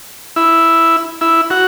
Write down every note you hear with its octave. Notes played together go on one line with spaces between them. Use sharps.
E4
E4
F#4